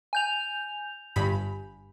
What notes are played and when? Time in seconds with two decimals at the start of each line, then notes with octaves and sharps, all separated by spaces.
0.13 G#5 G6 F7
1.16 G1 G2 B5